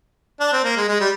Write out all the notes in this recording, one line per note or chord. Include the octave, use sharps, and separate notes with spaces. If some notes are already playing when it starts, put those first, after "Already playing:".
D4
C4
A#3
G#3
G#3
G3